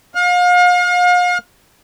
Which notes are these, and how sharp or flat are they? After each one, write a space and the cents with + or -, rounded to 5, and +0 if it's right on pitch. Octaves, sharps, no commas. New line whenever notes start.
F5 +40